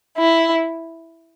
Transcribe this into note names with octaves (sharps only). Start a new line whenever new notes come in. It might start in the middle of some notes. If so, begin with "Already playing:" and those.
E4